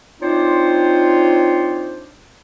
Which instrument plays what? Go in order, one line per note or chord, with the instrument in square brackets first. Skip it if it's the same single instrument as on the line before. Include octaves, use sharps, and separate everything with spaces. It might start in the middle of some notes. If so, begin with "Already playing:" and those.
[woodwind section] C4 D4 D#4 F4 C5 C#5